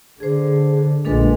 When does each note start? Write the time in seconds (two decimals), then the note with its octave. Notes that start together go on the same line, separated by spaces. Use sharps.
0.20 D3 G#4 C5
1.05 A#1 G#3 D4 A4 B4